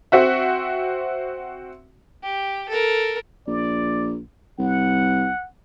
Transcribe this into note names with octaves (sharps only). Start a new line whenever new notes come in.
C4 F#4 E5
G4
A4 A#4
A#1 D5
C2 F#5